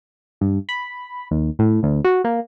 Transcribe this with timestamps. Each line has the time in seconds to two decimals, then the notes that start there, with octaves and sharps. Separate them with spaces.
0.41 G2
0.69 B5
1.31 D#2
1.59 A2
1.83 D2
2.04 F#4
2.24 A#3